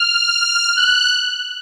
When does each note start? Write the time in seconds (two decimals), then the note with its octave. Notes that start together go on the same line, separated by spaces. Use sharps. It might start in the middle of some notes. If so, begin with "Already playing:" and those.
Already playing: F6
0.77 F#6